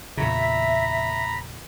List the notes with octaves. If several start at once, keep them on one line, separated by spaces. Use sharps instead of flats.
E2 A#2 C#3 E5 A#5 B5